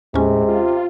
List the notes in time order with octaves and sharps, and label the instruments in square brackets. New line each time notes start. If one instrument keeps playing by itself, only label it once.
[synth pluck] D#2 C#4 [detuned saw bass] A2 [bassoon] C3 [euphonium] G#3
[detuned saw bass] F4